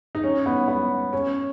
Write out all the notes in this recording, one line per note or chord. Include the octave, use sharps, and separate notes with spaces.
D#4
C#4
B3
B3
C#4